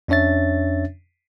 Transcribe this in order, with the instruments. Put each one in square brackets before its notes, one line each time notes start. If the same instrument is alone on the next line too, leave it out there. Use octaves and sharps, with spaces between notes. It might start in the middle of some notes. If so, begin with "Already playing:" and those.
[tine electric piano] F2 C#4 D4 C#5 E5 A6